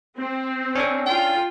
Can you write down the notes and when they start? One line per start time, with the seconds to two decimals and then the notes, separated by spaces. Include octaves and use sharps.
0.16 C4
0.75 C#4 D4 A4
1.06 F4 G5